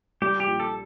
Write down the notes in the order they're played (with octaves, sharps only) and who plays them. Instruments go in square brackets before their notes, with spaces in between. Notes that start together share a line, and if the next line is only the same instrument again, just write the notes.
[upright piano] G3 [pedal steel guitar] G4
[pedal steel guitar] G4
[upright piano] A#1
[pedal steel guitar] A4